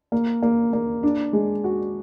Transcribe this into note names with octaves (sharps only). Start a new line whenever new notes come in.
A#3
A#3
A#3
D4
G#3
F#4